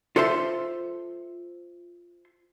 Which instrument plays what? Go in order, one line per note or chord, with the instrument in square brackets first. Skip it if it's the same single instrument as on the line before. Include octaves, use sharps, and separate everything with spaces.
[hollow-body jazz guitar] F4 A4 C5 E5 C6